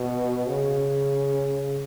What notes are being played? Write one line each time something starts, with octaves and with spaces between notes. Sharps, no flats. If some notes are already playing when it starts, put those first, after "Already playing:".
Already playing: B2
C#3